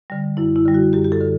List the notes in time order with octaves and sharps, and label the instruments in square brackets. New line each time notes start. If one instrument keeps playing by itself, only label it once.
[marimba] D3 G3
F#2 E4
E4
D3 G3
F#4
F#2 G4
G4
A4
D3